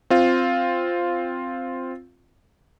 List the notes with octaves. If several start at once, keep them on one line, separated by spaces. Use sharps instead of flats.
C4 F4